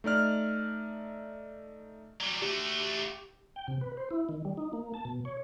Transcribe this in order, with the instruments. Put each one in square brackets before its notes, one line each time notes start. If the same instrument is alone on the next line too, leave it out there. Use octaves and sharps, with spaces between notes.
[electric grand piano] A3 D#4 D5 F6
[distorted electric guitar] F#3 G3
[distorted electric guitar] A3 F#4 [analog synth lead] G4
[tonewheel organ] G5
C3
B4
C5
E4
D#3
G3
D#4
A#3
A5
B2
C#5